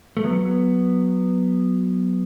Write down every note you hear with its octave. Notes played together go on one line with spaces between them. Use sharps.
A3
F#3 B3